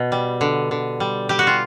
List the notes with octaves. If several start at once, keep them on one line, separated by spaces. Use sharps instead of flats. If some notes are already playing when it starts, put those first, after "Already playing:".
Already playing: B2
G3
D3
D3
G3
G3 G4
F#4
F4